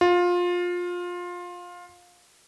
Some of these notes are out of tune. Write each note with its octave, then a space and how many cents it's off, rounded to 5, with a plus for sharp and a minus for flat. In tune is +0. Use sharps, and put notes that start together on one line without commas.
F4 +20